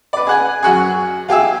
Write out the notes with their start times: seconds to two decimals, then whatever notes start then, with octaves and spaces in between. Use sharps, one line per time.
0.13 B4 D5
0.27 G#4 F#5 G#5
0.63 F#2 F#4 G#4
1.28 F4 G4 G#4 E5